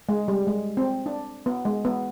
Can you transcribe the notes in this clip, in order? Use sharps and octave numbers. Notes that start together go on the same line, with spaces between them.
G#3
G3
G#3
C4
D4
B3
G#3
B3